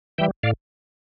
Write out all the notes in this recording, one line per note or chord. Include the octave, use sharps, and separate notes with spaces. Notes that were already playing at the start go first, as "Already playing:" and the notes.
E3 G3 E5 G5
A2 D5 F5